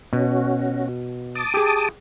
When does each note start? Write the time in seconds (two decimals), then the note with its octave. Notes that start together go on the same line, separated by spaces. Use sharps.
0.13 B2 C#4 F#4
1.35 A5 D6 D#6
1.54 G4 G#4